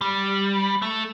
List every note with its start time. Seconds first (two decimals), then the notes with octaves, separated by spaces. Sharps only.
0.01 G3
0.82 A3